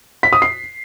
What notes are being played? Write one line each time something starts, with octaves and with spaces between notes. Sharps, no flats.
B6
D#6
C7